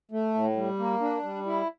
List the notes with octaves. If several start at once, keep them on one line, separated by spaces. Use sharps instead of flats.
A3
A2
G3
A#3
D4
G3
E4